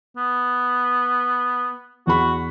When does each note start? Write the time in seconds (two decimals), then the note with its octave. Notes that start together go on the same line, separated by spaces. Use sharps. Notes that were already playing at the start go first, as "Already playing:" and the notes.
0.17 B3
2.07 E2 F#4 B5